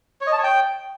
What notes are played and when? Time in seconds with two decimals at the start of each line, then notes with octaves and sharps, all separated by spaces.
0.21 C#5
0.27 D#5
0.32 A5
0.38 C#5
0.44 G5